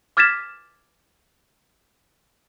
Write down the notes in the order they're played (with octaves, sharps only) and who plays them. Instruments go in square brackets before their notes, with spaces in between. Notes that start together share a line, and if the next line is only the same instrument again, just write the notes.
[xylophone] D6 F6 G#6 A6 B6 E7